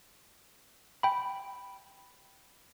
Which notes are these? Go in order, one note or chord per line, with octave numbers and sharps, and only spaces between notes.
G5 B5